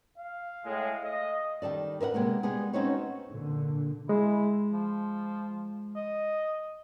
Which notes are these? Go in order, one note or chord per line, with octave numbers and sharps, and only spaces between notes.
F5
A2 G#3
D#5
D#3 G3 A4 D5
A#4 B4 E5 F#5
C3 G#3 A#3 B3
G3 G#3 B3 G#4
C4 C#4 D#4 F#4 B4 C#5
A#2 D3
G#3 E4
F3
D#5